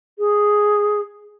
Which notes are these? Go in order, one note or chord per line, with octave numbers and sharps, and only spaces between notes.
G#4